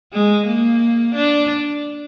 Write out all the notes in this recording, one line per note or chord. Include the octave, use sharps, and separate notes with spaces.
G#3
A#3
D4